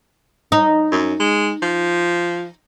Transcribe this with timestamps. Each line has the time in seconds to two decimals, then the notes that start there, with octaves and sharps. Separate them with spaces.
0.52 D#4
0.92 F#2
1.20 G#3
1.62 F3